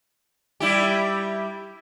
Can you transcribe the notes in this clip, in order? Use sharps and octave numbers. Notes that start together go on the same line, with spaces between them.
G3 E4 G4